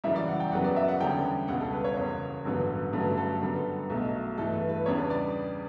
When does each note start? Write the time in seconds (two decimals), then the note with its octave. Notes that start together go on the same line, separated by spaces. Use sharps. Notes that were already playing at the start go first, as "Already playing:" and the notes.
0.04 F#2 C#3 E3 G3 E5
0.16 D5
0.28 F#5
0.40 G5
0.52 F#1 F#2 C#3 F#3 B3 F#5
0.64 D5
0.76 E5
0.88 F#5
1.00 E2 D3 G3 C#4 G5
1.48 C#2 B2 G3 F#5
1.61 A4
1.73 B4
1.84 C#5
1.97 F#1 E2 C#3
2.45 A1 G2 D3 F#3 B3
2.93 G2 D3 F#3 A3 C#4 B4
3.17 A4
3.41 F#2 D3 G3 B3
3.90 B1 B2 F#3 A3
4.38 G2 E3 A3 A4
4.53 B4
4.69 B4
4.86 E2 C#3 G3 D4 C#5
4.98 B4
5.10 D5